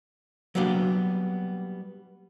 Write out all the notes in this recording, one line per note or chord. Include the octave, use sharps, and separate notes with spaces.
F#3 G3 A#3 B3 D4 G4